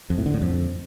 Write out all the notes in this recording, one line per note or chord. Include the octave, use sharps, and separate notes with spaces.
F2
A2
D3
A2
F2